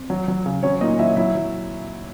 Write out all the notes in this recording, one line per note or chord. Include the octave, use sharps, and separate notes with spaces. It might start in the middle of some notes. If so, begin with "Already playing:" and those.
Already playing: C4
F#3
F#3
C#3
F#3 C#4 C#5
A#2 D#4 D#5
F#3 E4 E5
F#3 E4 E5
F#3